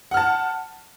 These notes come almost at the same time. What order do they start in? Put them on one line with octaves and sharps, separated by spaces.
F#5 F6 A5